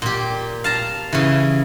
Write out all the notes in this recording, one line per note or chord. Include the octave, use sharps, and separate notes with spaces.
A#2 G4
F5 A5 A#5
C#3 E3